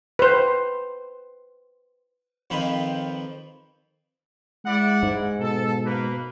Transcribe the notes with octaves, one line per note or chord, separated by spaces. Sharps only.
B4 C5
F2 D#3 F3 B4 C5
G#3 E4 D5 F#5
G#2
B2 A4
A#3 B4